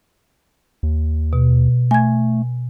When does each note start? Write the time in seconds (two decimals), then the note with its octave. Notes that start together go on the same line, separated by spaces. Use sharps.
0.83 D#2
1.33 B2
1.91 A3 G#5 G#6